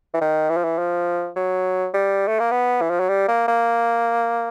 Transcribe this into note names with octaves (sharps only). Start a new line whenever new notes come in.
E3
D#3
E3
F3
E3
F3
F#3
G3
A3
A#3
B3
E3
F3
F#3
G3
A#3
A#3